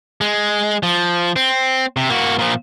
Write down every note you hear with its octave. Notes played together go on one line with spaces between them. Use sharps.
G#3
F3
C4
C3
A#3 F#4
A#2 F3